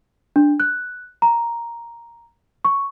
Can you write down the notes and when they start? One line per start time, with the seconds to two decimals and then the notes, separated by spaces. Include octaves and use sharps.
0.36 D4
0.60 F#6
1.22 A#5
2.65 C#6